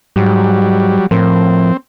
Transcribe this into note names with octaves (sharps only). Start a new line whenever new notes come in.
G#2 F#3 G3
A2 F3 C4 A#4